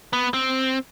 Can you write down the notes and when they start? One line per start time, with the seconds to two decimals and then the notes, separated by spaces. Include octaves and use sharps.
0.13 B3
0.34 C4